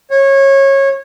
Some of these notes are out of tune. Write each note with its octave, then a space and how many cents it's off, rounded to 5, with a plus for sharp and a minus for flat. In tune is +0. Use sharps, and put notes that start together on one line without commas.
C#5 -20